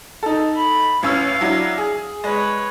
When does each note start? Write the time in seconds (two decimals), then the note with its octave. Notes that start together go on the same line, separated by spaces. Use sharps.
0.23 D#4 A4
0.55 B5
1.03 A1 C#4 F5 E6
1.41 F#3 D4 E4
1.78 G#4
2.24 G#3 B4 C#5